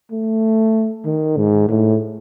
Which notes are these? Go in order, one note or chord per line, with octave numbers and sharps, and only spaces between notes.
A3
D#3
G#2
A2